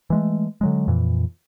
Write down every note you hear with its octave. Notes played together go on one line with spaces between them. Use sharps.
E3 G#3 A3
D3 F#3 G#3
F2 A#2 E3